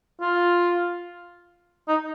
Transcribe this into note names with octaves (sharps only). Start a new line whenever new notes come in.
F4
D#4